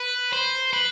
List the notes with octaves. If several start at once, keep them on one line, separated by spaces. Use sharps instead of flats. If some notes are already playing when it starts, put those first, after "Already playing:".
Already playing: B4
C5
B4